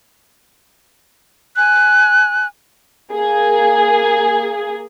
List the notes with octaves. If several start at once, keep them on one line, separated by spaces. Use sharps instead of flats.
G#5 F#6
A#3 G#4